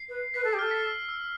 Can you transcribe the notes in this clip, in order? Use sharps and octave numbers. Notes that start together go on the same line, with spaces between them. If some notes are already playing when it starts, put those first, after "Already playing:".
Already playing: C7
B4
B4 B6
A4
G4
A4 F6
B6
E6
E6